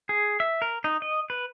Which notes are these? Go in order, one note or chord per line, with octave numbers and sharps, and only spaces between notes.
G#4
E5
A#4
D#4
D#5
B4